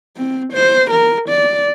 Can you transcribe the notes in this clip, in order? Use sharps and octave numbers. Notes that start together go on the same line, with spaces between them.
C4
C5
A#4
D5